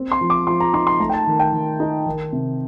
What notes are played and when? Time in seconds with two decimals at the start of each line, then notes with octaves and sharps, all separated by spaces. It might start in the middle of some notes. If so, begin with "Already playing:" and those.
Already playing: C4
0.12 C6
0.21 F3
0.30 D6
0.47 F3 C6
0.60 A#5
0.74 D#4 C6
0.87 C6
1.00 A3 A#5
1.10 G5
1.13 A5
1.27 D#3
1.40 G5
1.52 D#3
1.80 D#4
2.06 D#3
2.33 C3